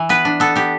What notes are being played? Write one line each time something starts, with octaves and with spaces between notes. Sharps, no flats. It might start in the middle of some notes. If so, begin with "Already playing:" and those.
Already playing: E3
B3 B4
D4
B3 A4
B3 G4